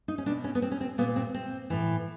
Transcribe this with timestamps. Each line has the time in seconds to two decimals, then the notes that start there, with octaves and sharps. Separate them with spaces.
0.08 D#4
0.18 C#4
0.26 B2 D4
0.44 C#4
0.55 B3
0.62 C4
0.72 C#4
0.81 C4
0.98 A#2 B3
1.16 C4
1.34 C4
1.70 A2 E3